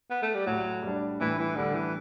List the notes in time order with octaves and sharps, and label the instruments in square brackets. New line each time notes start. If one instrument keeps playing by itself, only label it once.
[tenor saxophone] B3
A3
G3
[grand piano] A2 [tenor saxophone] F#3
[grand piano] G3 D4
[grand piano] A2 [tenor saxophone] E3
[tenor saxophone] E3
[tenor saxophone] D3 [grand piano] G3 D4
[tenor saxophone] E3